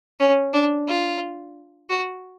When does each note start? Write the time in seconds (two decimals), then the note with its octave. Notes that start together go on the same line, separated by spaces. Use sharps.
0.20 C#4
0.53 D4
0.87 F4
1.90 F#4